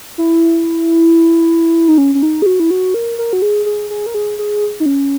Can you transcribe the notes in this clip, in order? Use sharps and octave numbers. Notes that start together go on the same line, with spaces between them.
E4
D#4
C#4
C#4
D#4
G#4
F#4
E4
F#4
A#4
A#4
F#4
G#4
G#4
G#4
A#4
G#4
G#4
D#4
C#4